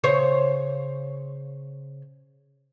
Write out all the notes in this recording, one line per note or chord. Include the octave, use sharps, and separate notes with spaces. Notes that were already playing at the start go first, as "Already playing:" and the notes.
C#3 C5 C#5